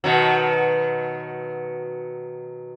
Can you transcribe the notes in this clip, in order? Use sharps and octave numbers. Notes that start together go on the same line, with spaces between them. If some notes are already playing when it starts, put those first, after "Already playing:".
B2 D#3 F#3